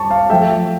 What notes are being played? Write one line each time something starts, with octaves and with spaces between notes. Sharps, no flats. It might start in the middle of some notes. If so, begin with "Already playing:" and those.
Already playing: G3 A5 C#6 D6
F5 A5
F3 A3 E5 G5